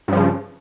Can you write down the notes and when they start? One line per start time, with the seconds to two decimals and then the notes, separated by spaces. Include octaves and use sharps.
0.08 G2
0.13 F3
0.17 C#3